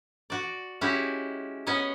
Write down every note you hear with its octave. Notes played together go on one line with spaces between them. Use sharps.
F#4 D5
G#3 C#4 E4 F#4 G4
B3 C#4 C#5 D#5